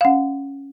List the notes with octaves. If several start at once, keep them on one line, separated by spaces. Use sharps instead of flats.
F5
C#4 F#5